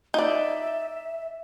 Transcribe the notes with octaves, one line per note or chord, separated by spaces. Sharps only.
D#4 D5 E5